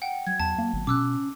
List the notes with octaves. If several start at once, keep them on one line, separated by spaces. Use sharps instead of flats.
F#5 G5
F#3 G#6
E2 A5
A#3
G#1
B2 C#4 D6 E6 F#6